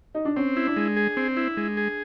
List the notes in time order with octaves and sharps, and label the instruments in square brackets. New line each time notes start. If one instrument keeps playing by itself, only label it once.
[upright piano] D#4
D4
[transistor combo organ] C4 [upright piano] C#4
[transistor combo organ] E4
[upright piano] D4
[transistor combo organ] G#3
G#4
C4
E4
G#3
G#4